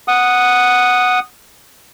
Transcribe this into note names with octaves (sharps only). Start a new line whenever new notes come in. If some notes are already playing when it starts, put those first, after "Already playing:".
F#5 D#6